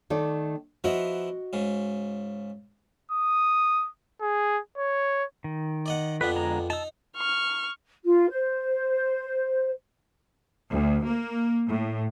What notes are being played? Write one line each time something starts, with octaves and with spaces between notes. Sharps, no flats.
D#3 A3 D5
F3 B3 E4 F#4 D#5
G#2 C#3
D#6
G#4
C#5
D#3
D5 D#5 F#5
F2 B3 D4 B4
D3 G#3 A#5
D#4 A5 A#5 E6
C#6 F6
F4
C5
D2
A#3
A2